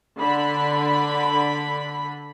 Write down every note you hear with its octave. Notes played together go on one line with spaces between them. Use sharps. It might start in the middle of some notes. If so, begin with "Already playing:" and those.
D3 B5